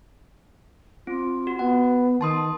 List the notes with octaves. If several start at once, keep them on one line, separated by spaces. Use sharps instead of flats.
C4 F4
F#4
B3 F#5
D#3 A5 C6 D#6